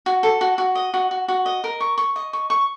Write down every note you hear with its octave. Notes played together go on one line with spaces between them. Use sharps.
F#4
A4
F#4
F#4
D#5
F#4
F#4
F#4
D#5
A#4
C#6
C#6
D#5
C#6
C#6